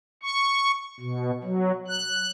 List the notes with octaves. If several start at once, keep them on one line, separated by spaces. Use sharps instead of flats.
C#6
B2
F#3
F#6